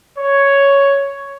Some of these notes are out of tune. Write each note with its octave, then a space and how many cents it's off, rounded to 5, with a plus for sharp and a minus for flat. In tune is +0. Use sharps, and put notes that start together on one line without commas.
C#5 +5